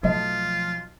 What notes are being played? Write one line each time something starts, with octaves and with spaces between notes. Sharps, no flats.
B1 F3 A3 F4 D#5 A5